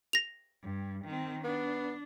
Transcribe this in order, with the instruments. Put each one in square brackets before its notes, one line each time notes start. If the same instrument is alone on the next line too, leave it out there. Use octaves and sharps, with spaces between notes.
[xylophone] A#6 F7
[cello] G2
D#3 C4
[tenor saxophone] B3 [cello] D4